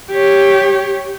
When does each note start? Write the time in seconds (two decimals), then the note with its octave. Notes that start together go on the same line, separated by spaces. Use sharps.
0.11 G4 C#5